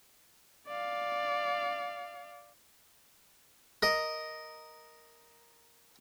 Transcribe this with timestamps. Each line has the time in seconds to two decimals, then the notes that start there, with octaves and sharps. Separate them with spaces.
0.67 D5 F5
3.83 A#4 D#5